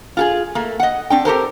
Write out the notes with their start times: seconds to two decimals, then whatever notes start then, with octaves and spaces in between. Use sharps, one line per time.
0.17 F4 G4 G#4
0.55 A3 A#3
0.80 D#5 F#5
1.10 C4 D4 G5
1.25 G4 A4 A#4 C5